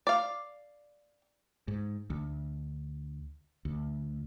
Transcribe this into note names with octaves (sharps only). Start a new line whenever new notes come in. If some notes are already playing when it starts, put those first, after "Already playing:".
D5 F5
G#2
D2
D2